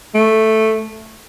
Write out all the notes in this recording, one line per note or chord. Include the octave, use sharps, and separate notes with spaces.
A3